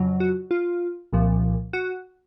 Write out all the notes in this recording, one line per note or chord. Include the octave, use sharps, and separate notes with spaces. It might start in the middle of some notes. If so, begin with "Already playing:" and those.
Already playing: F2 C#3 F#3
F#4
F4
C2 A#2 F3
F#4